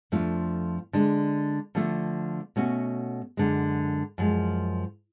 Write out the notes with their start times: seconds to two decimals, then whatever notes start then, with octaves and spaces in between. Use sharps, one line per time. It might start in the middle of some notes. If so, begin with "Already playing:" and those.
0.12 F2 F3 A3 D4 F4
0.93 D3 G#3 D4
1.75 D3 F3 A3 F4
2.56 B2 A3 C#4 F#4
3.37 F#2 D3 G#3
4.18 F#2 F3 G#3